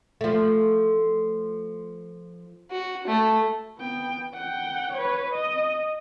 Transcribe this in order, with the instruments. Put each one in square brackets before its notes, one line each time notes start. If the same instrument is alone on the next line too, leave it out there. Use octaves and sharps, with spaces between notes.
[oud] F3 A3
[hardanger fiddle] F#4
A3
[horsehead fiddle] B3 G5
F#5 G5
B4 C#5
D#5